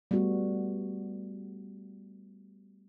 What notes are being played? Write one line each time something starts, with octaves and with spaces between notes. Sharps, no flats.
G3 A3 B3 F#4